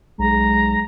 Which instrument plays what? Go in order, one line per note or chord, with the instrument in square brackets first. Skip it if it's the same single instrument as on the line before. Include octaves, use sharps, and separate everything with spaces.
[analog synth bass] B1 [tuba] G#3 [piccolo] A#5